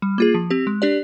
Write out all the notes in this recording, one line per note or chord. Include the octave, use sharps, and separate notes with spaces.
G3
A#3 F4 G#4
F3
C4 G4
G#3
D4 G4 D5